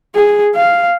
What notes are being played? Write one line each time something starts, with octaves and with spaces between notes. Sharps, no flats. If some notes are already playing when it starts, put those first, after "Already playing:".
G#4
F5